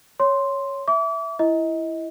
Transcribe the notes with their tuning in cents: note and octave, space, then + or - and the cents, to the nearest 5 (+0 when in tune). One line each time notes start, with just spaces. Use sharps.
C#5 +0 C6 +0
E5 +0 D6 -35
E4 +10 D#5 +30